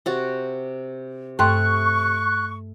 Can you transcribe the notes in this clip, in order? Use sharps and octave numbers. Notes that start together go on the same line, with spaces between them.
C3 F#4
G2 A3 G5 C6 C#6 F#6